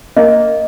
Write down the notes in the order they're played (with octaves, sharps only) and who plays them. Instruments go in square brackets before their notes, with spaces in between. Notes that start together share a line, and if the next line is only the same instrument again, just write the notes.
[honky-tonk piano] A#3 [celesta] D#5